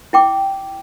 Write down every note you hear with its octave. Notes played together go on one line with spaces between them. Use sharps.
E4 G5 D6